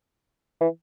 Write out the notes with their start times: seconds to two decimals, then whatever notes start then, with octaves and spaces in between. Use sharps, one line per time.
0.61 E3